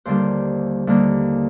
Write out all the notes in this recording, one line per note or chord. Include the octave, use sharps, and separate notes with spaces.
D#2 D3 G3 A#3 C5
D#2 D3 G3 A#3